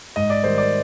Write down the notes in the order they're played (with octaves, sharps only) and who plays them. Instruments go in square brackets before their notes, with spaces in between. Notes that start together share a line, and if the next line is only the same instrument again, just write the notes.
[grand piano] G#2 D#5
D5
D#3 G3 C5
D5